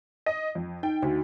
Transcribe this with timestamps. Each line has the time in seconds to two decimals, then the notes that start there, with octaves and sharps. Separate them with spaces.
0.26 D#5
0.55 F2
0.83 D#4 G5
1.02 D2 F#4